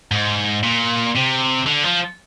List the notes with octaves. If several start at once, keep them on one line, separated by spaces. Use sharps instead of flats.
G#2
A#2
C3
D3
F3